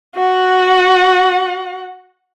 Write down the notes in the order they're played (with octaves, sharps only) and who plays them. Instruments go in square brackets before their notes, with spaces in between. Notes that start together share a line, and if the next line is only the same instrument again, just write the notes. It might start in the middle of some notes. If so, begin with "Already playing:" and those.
[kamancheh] F#4 F#5